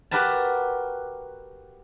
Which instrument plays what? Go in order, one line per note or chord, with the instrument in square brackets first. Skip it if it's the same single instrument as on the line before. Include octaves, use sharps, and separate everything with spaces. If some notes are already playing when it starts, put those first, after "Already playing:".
[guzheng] F#4 G4 A#4 B4 A5